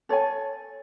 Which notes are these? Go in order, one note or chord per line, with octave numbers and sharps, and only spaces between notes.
A4 C#5 G#5